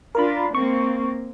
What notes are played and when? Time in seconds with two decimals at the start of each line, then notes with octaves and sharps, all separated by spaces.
0.15 D4 F4 A#4 A#5 B5
0.55 A#3 C4 C#6